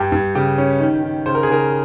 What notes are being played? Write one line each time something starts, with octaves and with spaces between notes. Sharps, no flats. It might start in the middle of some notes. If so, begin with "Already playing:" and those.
Already playing: G2 G4
G2
C#3 G4
C#4
D#3
D#3
C#3 C5
A#4
G#4
C#3 A#4